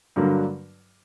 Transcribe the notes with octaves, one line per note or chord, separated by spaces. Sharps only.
G2 D3 F#3 A#3